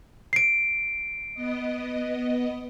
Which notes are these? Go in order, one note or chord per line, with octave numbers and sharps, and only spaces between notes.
C7 D7
B3 D#5